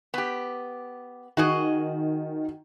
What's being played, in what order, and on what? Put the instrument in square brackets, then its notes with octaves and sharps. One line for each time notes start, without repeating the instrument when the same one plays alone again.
[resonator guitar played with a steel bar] B3 G4
[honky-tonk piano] D#3 [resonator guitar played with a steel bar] F#4 G#4 D#5